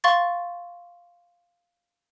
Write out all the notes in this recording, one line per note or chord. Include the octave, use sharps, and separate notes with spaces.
F5 C6 C#6 A6